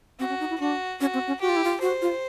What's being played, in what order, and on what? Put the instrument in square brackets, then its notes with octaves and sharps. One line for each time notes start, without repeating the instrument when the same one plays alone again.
[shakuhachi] C4 [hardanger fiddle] F#4
[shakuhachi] C#4
D#4
E4
[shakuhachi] D4 [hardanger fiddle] F#4
[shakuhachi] C#4 [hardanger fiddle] F#4
[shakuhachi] C4
C#4
[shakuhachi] F#4 [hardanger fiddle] G4
[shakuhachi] F4
E4
F4
[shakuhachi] F#4 [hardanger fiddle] C5
[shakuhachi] F4